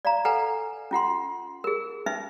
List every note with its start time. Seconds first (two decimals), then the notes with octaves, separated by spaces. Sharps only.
0.05 D5 F5 A#5
0.25 A4 B4 F#5 G#5 A#5
0.91 C#4 F4 F#5 C6
1.64 G#4 A#4
2.06 C#4 D#4 B4 E5